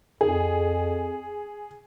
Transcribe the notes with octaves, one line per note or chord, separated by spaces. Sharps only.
F2 G#4